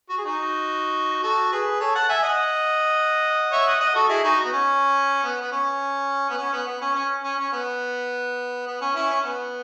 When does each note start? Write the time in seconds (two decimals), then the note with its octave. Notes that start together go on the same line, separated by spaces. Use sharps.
0.09 F#4
0.17 G#4
0.25 D#4 F#4
1.23 F#4 A4
1.52 G#4 B4
1.80 A4 C#5
1.95 F#5 A5
2.09 E5 G#5
2.23 D#5 F#5
3.52 C#5 E5
3.66 D#5 F#5
3.80 D#5 F#5
3.95 F#4 A4
4.09 E4 G#4
4.24 D#4 F#4
4.44 B3
4.52 C#4
5.24 B3
5.42 B3
5.52 C#4
6.30 B3
6.37 C#4
6.53 B3
6.67 B3
6.82 C#4
6.95 C#4
7.24 C#4
7.39 C#4
7.53 B3
8.67 B3
8.81 C#4
8.95 C#4 E4
9.10 C#4
9.24 B3